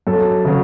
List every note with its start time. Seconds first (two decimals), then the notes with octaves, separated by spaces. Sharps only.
0.07 F#2 A4
0.45 C#3 F#3